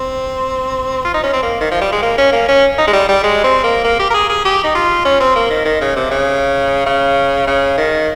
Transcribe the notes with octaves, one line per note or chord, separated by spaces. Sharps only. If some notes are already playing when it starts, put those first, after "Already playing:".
Already playing: C4
F4
D#4
C#4
C4
A#3
D#3
F3
G3
G#3
A#3
C#4
A#3
C#4
D#4
G#3
G3
G3
G#3
C4
A#3
A#3
G4
A#4
G#4
G#4
G4
D#4
F4
C#4
C4
A#3
D#3
D#3
C#3
C3
C#3
C#3
C#3
D#3